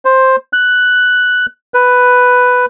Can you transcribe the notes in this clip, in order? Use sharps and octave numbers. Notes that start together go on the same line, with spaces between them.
C5
F#6
B4